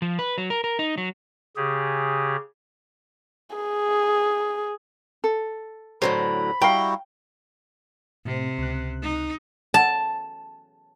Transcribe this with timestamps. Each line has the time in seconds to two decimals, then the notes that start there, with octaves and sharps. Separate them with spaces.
0.02 F3
0.19 B4
0.38 F#3
0.50 A#4
0.64 A#4
0.79 D#4
0.98 F#3
1.57 C#3 G4 G#4
3.56 G#4
5.24 A4
6.02 A2 D3 F#3 C5 B5
6.62 G3 E4 F#4 F5 G5 A#5
8.25 A2 C3 C4
8.58 C#2 F#6
9.02 D#4
9.74 A5